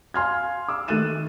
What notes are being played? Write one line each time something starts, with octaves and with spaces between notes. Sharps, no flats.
F5 G#5 C6 F6 G#6
D6 E6
D#3 A3 F#6 A6 D#7 E7